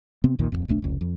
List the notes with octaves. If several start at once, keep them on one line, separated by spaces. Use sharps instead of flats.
C3 B3 C4
A#1 D#2 A#2 D#3
D1 A#1 F2
D1 B1 A3 D4
F1 C#2
F2